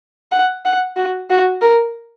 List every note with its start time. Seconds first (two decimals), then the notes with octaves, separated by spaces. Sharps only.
0.32 F#5
0.65 F#5
0.97 F#4
1.30 F#4
1.62 A#4